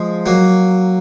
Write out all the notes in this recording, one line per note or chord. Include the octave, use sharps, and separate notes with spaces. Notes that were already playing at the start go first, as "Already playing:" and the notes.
Already playing: F3 G#3
F#3 A#3